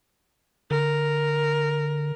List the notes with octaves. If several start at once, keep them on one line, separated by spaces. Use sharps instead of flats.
D3 A#4